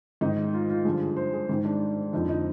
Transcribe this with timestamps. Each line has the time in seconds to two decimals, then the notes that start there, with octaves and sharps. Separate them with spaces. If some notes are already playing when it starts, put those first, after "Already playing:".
0.21 G#2 D#3 D#4
0.54 F4
0.69 F4
0.85 G2 D3 F3 G#4
1.16 C5
1.33 G#4
1.49 G#2 D#3
1.65 D4
2.13 F2 D3 F3 D#4
2.29 D#4